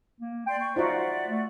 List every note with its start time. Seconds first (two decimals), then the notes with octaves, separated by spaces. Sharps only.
0.21 A#3
0.47 D5 G5 C6
0.60 C#6
0.76 D#4 F4 F#4 C5 D5 E5 F#5
1.27 A3